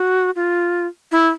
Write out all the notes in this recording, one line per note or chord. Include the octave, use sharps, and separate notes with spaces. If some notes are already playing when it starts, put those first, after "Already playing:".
Already playing: F#4
F4
E4